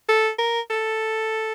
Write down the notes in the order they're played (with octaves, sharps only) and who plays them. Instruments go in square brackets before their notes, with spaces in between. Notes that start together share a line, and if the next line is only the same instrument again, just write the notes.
[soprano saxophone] A4
A#4
A4